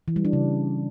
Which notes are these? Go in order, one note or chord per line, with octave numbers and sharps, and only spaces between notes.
E3
G3
D4
C#3